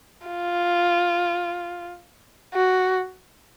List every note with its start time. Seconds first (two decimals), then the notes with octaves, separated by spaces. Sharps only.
0.27 F4
2.54 F#4